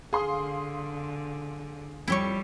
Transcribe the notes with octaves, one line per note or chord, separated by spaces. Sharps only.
D3 G#4 F5 C6 D#6
F2 G3 E4 G4 C#5 C#6